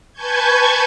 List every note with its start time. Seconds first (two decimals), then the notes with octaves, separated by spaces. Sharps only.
0.13 B4 G#5 A5 C#6 G6 G#6